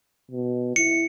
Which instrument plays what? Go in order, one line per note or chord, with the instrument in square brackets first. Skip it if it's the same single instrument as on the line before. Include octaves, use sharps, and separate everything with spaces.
[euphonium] B2
[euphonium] E4 [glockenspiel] C#7